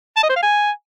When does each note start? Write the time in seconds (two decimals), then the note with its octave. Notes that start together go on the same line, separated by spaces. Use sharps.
0.17 A5
0.23 D#5
0.30 C5
0.36 F5
0.42 G#5